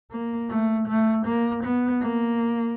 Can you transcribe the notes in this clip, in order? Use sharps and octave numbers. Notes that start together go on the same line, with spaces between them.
A#3
A3
A3
A#3
B3
A#3